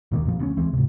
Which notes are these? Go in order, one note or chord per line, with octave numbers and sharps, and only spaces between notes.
D#2 A#2 D#3 A#3
F#2 A#2 F3
D2 B3 C#4
C#2 E3 G#3 C4
G#2 C3